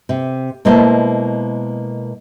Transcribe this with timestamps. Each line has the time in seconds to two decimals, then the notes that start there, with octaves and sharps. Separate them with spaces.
0.09 C3
0.65 B2 G#3 A#3 E4 C5 A5